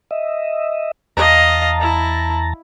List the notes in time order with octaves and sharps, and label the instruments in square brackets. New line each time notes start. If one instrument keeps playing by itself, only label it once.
[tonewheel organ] D#5 E5
[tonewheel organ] E2 A5 A#5 [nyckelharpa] D#5 F5
[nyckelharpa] E4